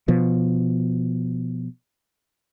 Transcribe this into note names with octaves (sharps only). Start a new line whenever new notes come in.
B2 F3